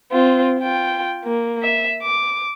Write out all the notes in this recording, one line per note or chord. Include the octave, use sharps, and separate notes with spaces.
C4 F4
F4 G5
A#3
E5
D6